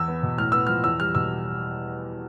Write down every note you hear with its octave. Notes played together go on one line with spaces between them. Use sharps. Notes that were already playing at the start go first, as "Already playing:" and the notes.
Already playing: E2 E3 E6
B3
B2
A2 F6
B3 E6
F3 F6
E2 E6
G3 F6
B2 E6